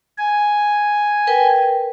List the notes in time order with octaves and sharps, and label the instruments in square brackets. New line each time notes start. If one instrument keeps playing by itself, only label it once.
[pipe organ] G#5
[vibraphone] A#4 B4 G5